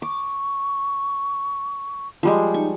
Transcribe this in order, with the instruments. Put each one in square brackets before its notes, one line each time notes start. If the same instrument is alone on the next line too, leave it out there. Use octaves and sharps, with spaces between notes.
[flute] C#6 [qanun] D6
[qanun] F3 G3 G#3
[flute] D#4 [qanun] C#6